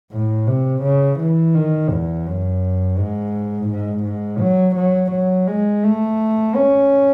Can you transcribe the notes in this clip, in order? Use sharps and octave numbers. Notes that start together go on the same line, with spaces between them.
A2
C3
C#3
E3
D#3
E2
F#2
G#2
G#2
G#2
F#3
F#3
F#3
G#3
A3
C#4